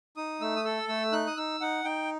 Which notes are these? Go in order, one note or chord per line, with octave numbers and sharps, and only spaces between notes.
D#4 D#6
A3 E6
D#6
A4 E6
A3 E6
D#4 F#6
D#6
D#4 E6
D#4 F#5
D#4 G5